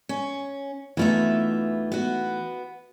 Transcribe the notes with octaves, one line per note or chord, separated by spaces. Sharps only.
C#4
E2 E3 A3 D#4 F4 E5
B3 F#4